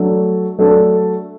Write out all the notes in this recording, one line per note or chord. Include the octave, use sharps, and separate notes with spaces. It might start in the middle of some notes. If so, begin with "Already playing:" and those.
Already playing: F#3 A3 D4 A4
F#3 A3 D4 A4